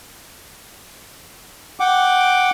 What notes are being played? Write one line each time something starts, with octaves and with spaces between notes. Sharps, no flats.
F#5 G5 D6